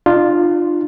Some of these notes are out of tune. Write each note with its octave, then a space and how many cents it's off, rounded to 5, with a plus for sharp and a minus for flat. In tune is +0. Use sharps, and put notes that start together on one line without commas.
D4 +45 F4 +0